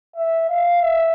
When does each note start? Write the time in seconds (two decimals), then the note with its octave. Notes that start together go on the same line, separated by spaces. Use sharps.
0.16 E5
0.49 F5
0.82 E5